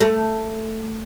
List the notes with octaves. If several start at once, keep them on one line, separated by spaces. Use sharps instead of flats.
A3